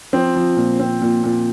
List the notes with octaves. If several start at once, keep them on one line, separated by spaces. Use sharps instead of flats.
F3 C4 C5
F3
A#2
C4
A#2
A#2